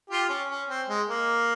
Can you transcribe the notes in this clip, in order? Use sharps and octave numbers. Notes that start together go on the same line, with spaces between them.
F4 G4
C#4
C#4
C4
G#3
A#3